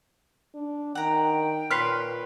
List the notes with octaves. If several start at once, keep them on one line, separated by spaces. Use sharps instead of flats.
D4
D#3 F#5 G5 A#5
A#2 B4 C#5 C6 F6 B6 C7